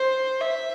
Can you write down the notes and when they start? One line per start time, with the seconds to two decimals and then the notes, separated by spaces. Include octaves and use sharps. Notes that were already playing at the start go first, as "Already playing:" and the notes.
Already playing: C5
0.41 E5